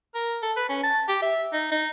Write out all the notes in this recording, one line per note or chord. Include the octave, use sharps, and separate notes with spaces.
A#4
A4
B4
C#4
A5
G4
E5
D#4
D#4